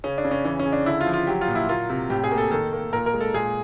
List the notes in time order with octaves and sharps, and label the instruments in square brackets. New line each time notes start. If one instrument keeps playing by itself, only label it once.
[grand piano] C#3 C#4
D4
C#3
C#4
E3 C#4
C#4
C#3
D4
D3 E4
F4
F3
F4
F#3 G4
F4
A#2
E4
A#3 F4
C3
A2 G4
G#4
A#3
A4
D#3 A4
A#3
A#2 A#4
A#4
G#3
A4
A#2 G#4